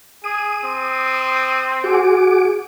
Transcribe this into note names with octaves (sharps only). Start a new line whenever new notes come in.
G#4 D#6
C4
F#4 G#4 D6